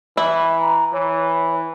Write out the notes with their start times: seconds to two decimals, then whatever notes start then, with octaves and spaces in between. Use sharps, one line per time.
0.17 E3 E4
0.61 A#5
0.93 E3 C#5